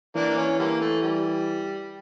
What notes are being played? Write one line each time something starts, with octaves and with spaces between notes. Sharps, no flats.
E3 A#3 D4
D4
C#4
D3 G3 A#3
A3
G3